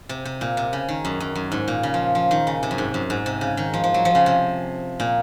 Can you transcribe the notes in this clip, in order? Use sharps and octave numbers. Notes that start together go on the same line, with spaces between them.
C3
C3
A#2
C3
C#3
D#3
F#2
F#2
F#2
G#2
A#2
C#3
F3
F3
D#3
C#3
C3
F#2
G#2
F#2
G#2
C3
C#3
D#3
F3
F3
F#3
F3
C#3
C3
A#2